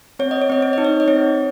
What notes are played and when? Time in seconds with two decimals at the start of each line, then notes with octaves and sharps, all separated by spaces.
0.19 C4 C#5
0.31 D#5
0.42 C#5
0.50 C4 D#5
0.62 C#5
0.73 D#4 D#5
0.85 C#5
1.00 D#5
1.08 C4 C#5